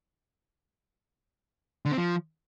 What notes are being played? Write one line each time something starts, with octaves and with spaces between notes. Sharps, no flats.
D3
C4
F3